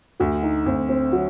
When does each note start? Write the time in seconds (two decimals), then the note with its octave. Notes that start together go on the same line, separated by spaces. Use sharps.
0.20 D2 F#4
0.43 D#4
0.66 D2 C4
0.89 C4
1.12 F#3 F#4